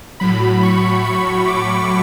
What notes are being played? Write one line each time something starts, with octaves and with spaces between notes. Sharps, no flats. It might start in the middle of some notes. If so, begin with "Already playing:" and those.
A2 F#3 B5
C#6
C#6
D6